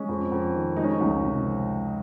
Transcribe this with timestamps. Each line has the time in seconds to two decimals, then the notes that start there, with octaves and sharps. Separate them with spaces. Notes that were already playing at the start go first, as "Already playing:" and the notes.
Already playing: G#3 C#4
0.09 F2
0.32 F2
0.54 D#3
0.76 G#3 D#4
0.84 C#4
0.91 D#4
1.01 C#2
1.23 C3